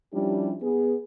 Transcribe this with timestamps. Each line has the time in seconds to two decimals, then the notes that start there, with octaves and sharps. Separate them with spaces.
0.13 F3 G3 C#4 D4 E4 G4
0.62 B3 G#4